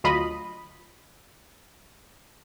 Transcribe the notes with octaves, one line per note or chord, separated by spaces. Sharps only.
D2 F#3 F4 D#5 B5